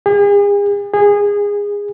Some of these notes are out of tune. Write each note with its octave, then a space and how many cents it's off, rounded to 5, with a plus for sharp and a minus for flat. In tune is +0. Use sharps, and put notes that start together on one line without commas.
G#4 -40
G#4 -20